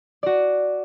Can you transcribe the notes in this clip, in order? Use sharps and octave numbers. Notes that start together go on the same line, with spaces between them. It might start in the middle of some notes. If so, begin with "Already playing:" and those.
F#4 D5